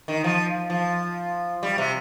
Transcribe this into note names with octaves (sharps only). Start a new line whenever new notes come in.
D#3
F3
F3
G3
C3